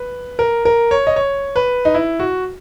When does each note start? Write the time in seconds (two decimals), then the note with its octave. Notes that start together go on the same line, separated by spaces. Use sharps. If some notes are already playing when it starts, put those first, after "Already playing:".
Already playing: B4
0.39 A#4
0.65 A#4
0.91 C#5
1.07 D#5
1.16 C#5
1.56 B4
1.85 D#4
1.94 E4
2.20 F#4